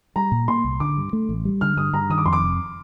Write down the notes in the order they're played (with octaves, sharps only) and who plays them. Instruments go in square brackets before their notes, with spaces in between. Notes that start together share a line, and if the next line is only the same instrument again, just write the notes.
[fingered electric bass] G3 [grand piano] A#5
[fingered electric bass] A#2
[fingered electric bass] A#3 [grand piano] C6
[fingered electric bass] C2
[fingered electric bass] D3 [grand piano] D6
[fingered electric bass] G2
A3
A1
G3
[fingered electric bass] D3 [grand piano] F6
[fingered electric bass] G2 [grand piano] D#6
[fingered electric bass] G2 [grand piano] A#5
[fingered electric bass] D#3 [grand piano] D#6
[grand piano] D6
[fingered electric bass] F2 [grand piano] C6
[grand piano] D6
[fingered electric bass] F1